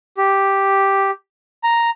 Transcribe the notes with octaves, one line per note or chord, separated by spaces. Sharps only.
G4
A#5